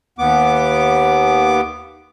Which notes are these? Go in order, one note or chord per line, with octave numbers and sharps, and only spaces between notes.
D#2 B3 D6